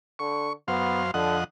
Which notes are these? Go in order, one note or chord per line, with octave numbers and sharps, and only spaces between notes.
D3 C#6
F#2 B3 C5 F5
F2 D3 D#5 F#5